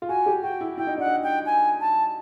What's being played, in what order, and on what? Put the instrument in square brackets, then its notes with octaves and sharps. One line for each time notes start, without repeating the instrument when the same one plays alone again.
[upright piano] F4
[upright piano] F#4 [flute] G#5
[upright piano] G4
[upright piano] F#4 [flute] G5
[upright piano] E4
[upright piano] E4 [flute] G5
[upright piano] D#4
[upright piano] D4 [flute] F#5
[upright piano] D#4
[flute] G5
G#5
A5